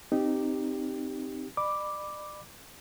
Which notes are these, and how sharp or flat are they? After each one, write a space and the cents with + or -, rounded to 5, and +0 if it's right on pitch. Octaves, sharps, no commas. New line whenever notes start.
C4 +0 D#4 -15 G4 +0
D5 +40 B5 +0 D6 +0